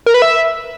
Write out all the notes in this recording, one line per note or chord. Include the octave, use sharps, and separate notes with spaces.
A#4
B4
E5